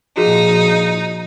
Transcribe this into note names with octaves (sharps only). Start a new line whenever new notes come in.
A#2 F3 D#4 F#4 G#4